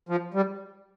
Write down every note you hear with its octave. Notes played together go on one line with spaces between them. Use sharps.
F3
G3